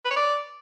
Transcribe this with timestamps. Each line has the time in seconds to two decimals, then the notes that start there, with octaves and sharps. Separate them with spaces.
0.05 B4
0.11 C#5
0.16 D5